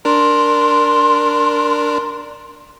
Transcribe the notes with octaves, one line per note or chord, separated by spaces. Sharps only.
D4 A#4 C6